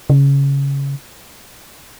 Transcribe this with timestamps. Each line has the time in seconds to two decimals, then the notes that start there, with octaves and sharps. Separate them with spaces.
0.10 C#3